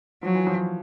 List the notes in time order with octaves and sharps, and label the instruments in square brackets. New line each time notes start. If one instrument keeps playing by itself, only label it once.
[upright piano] F3 [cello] F#3
[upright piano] E3
F3